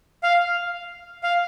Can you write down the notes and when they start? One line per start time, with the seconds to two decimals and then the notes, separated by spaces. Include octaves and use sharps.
0.23 F5
1.23 F5